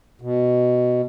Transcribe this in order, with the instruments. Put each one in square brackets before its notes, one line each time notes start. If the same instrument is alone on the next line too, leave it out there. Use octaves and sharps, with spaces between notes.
[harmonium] B2